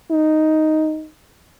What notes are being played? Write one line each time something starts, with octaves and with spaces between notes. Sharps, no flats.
D#4